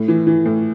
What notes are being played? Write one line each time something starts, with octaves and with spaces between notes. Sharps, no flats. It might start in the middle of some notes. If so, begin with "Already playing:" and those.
Already playing: A2
E3
E3
A2